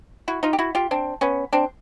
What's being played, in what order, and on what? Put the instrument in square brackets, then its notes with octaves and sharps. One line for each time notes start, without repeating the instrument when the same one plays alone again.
[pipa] E4 F#4
D#4 F4
G4
E4 F#4
F4 G4
C4 D4
B3 C#4
C4 D4